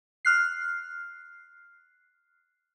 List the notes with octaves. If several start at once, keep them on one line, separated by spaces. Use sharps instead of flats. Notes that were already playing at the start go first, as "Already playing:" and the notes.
F6 F#6 C7